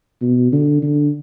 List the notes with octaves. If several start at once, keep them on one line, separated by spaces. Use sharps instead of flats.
B2
D3
D3